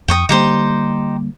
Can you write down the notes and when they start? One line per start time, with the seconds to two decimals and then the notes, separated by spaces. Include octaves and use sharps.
0.08 F2 G5 C#6 D#6
0.29 D3 G3 A#3 D#4 G4 C5